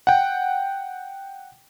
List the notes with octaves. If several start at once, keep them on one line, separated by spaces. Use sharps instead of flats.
F#5 G5